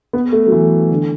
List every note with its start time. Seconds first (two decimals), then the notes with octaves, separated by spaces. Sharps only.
0.13 B3
0.32 A3
0.46 F#3
0.52 E3
0.91 D3